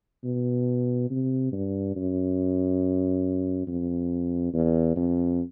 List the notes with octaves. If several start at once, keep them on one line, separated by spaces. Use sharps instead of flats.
B2
C3
G2
F#2
F2
E2
F2